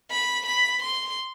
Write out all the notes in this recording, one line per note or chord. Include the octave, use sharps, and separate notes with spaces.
B5
B5
C6